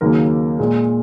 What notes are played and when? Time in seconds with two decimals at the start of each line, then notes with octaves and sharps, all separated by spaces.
0.01 D#2 C#3 F#3 A#3 A#4
0.59 A#2 G#3